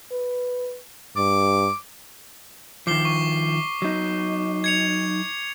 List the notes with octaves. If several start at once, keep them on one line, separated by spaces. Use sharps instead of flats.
B4
G2 D6
D#3 F3 D6 C7 G7
C#6
F#3 D#4
G#6 C#7 F7